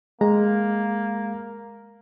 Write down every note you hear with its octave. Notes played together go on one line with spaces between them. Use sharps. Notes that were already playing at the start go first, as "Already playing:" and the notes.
G#3 A#3 A#5